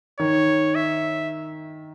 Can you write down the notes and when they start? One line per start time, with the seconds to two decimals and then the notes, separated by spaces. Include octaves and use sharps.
0.20 D#3 C#5
0.75 E5